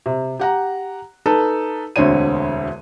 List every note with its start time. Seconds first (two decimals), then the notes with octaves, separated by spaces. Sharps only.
0.06 C3
0.39 G4 F#5 A#5
1.26 D#4 A4 B4 A5
1.96 E1 D2 D3 C4 C#5 D#7